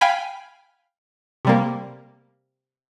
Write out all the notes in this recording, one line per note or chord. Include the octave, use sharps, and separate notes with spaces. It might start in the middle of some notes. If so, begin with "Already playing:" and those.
F5 G5 G#5 B5
C3 G3 A#3